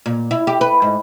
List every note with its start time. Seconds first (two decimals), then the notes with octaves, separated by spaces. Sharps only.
0.06 A#2
0.31 E4
0.47 G4
0.61 B4
0.82 G#2